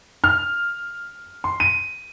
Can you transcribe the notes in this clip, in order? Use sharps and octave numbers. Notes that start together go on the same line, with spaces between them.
F6
C6
D#7